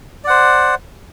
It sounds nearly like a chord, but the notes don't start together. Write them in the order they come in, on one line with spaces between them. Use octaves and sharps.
D5 F#5 C5